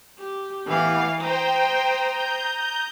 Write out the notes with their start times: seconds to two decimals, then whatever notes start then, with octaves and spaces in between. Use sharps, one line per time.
0.19 G4
0.66 A2 E3 B3 G4 F5
1.21 C5 G5 A#5 D#6
2.11 G6